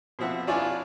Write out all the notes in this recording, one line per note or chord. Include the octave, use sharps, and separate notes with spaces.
B2 F3 C4 E5 F#5
D4 E4 F4 C#5 D5 G#5